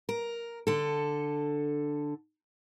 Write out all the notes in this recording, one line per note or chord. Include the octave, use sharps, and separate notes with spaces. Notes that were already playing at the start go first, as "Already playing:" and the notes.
A#4
D3 A4